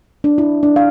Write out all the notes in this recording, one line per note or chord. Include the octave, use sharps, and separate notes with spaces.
D4
E4
D4
F5